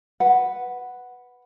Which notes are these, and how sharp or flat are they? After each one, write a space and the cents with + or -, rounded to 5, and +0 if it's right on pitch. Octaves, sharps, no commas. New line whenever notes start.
B4 +0 F#5 +0